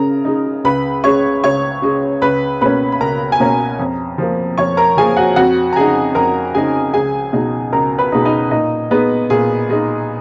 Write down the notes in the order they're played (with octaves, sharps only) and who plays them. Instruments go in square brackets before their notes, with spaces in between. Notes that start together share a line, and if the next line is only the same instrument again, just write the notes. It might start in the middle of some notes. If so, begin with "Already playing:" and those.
Already playing: [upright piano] C#3 A#4 A#5
G#3 D#4
C#2 B4 B5
C#3 G#3 C#5 C#6
C#2 C#5 C#6
C#3 G#3
C#2 B4 B5
B2 A#3 C#4 B4 B5
B5
C#2 A#4 A#5
G#5
B2 A#3 C#4 A#4 A#5
F2
F3 A#3
F2 C#5 C#6
A#4 A#5
F3 A#3 G#4 G#5
F#4 F#5
F2 F#4 F#5
A#5
C#3 G#3 D#4 G#4 G#5
F2 A#4 A#5
C#3 G#3 D#4 G#4 G#5
C#2 G#4 G#5
B2 G#3 D#4
C#2 A#4 A#5
B4 B5
B2 G#3 D#4
D#4 D#5
A#2 D#4 D#5
G#3 B3 D#4 B4
A#2 G#4
G#3 D#4